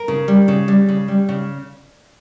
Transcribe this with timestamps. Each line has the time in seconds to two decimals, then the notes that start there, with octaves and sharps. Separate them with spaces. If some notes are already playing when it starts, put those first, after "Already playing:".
Already playing: A#4
0.08 C#3
0.28 G3
0.48 C#3
0.68 G3
0.88 C#3
1.08 G3
1.29 C#3